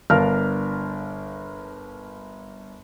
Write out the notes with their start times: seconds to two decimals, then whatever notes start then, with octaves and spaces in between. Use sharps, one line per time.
0.10 G1 D4 A#4 F5 A5 F6